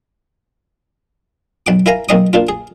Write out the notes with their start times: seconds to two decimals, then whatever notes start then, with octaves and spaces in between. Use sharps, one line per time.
1.67 B1 F#5 D6
1.86 E4 A#4 F5 G#5 A#5
2.09 B1 A#3 C4 D#5 C#6 D#6
2.33 A#3 D4 F4
2.49 G#4